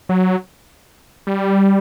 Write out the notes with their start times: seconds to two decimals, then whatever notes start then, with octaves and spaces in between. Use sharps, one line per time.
0.09 F#3
1.27 G3